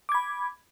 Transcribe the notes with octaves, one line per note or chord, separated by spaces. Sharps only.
B5 D6 G#6